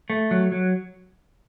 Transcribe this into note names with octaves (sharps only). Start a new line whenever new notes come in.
A3
F#3
F#3